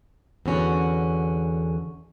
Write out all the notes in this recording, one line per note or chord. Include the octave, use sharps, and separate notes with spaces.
E2 D3 C#4 F#4